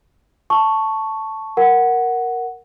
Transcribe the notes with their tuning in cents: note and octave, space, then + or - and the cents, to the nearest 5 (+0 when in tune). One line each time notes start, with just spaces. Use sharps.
A5 +0 C#6 +0
A#4 +0 F#5 +0